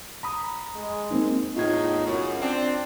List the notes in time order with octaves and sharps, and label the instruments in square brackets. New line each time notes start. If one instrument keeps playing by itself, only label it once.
[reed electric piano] A#5 B5 D#6
[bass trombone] G#3
[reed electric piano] A#3 C4 D#4
[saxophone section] E2 A2 [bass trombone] D#4 [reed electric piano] F4 G#6
[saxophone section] F#2 [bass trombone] C#3
[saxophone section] C4 [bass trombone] D4